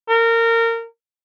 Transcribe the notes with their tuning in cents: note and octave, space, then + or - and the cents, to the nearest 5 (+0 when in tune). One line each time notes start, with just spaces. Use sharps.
A#4 -25